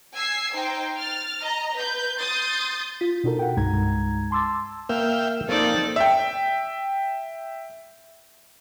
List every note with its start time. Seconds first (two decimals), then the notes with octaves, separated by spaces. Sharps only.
0.15 G#5 E6 G#6 C7
0.54 D#4 C5 G5
0.99 F6 A6
1.43 D#5 A#5
1.74 B4 G6
2.19 C6 D#6 G6 A6
3.01 F4 B6
3.24 B2 D4 D#4 F#4 A4 A#4
3.39 F#5 G5
3.57 C2 G2 G#3 D#4 A#5 G#6
4.31 A5 C6 D6 E6 A6
4.89 A#3 E5 F5 G5
5.49 F3 A#3 C4 D#4 A4 D5
5.96 E5 G5